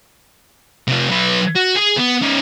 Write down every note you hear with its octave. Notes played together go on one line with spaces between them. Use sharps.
C3 F4
F#3 B4
F#4
G#4
B3
C#4 D#4